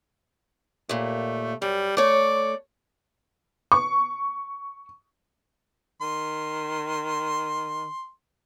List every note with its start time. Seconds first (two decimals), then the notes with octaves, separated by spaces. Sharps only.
0.89 D#2 A#2 A3
1.62 F#2 G3
1.97 A3 C#5 D5
3.72 C#6
6.01 D#3 C6